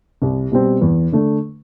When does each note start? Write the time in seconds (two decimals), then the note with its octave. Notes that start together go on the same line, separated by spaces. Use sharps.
0.22 C2
0.51 B2 G3 C4
0.82 E2
1.12 D3 A3 D4